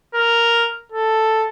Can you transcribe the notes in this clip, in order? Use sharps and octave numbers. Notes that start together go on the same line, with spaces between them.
A#4
A4